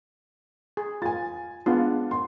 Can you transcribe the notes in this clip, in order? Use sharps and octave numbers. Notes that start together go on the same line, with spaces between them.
G#4
F4 G#5 A6
G#3 B3 D4 F4
C6